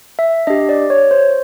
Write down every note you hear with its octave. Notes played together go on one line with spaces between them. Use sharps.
E5
D4 G4 D#5
D5
C#5
C5